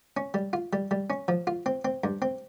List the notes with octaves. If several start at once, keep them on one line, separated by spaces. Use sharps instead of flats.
C#4
G3
F4
G3
G3
C#4
F3
F4
C4
C4
G2
C4